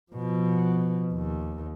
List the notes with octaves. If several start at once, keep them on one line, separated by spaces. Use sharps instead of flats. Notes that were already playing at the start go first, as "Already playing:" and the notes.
B2 F3
D#2